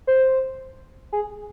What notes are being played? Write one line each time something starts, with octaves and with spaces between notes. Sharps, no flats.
C5
G#4